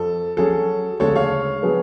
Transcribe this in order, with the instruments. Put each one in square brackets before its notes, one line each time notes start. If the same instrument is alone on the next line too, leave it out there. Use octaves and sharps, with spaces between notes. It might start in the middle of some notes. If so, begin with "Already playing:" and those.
Already playing: [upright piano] F2 [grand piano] A4
[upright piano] F#3 C#4 G#4 C#5 [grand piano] A4
[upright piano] D2 C#3 G#3 [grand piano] A4 C#5
[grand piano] C#5 F5
[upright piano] F#3 B3 D4 G#4